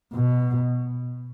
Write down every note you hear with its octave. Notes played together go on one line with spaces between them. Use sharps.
B2